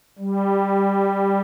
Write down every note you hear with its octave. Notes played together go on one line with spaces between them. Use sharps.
G3